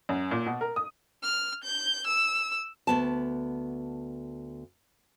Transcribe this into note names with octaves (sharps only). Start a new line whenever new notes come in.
F#2
A#2
B2
A#4
D#6
F6
G6
E6
D2 B3 A5